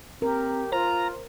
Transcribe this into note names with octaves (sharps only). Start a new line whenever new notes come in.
C4 G4 A#4
F4 C5 A#5